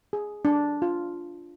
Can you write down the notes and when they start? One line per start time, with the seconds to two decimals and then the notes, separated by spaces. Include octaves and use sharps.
0.13 G#4
0.45 D4
0.82 F4